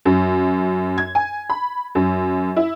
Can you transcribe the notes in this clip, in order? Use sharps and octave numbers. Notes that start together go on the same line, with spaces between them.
F#2
G#6
G#5
B5
F#2
E4